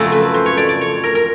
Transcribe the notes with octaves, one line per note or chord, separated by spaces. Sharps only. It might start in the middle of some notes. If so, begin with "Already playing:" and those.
Already playing: F2 C#3 F#3 A3 A4
B4
C5
C#5
D5
D5
C#5
A#4
A#4